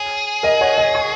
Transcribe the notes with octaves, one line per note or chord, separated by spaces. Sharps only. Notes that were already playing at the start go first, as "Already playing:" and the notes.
Already playing: G#4 C#5
A#4 D#5
C#5 F#5
D#5 G#5
G#5 C#6